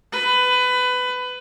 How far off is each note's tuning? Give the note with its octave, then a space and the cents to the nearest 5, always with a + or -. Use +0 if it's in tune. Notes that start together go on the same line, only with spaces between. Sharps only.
B4 +20